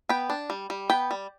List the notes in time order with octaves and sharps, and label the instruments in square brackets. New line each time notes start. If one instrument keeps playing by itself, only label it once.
[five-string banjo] B3 G5 B5
D4
G3
G3
B3 G5 B5
G3